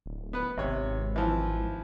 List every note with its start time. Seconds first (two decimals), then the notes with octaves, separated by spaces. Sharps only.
0.06 D1
0.33 B3 B4
0.57 G#1 C3 C#5
1.16 E3 F3